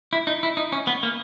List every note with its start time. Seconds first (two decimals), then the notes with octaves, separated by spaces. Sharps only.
0.13 E4
0.27 D#4
0.43 E4
0.57 D#4
0.72 C#4
0.87 B3
1.03 A#3